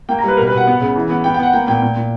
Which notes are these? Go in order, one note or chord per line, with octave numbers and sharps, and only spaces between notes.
A#3 G5
A#5
G3 B4
B2 A#4
B4
B2
F#5
B3
C#3
E3
B3
B3 G5
G5
B3 F#5
A#3 G5
A#2 G5
A#2
A#2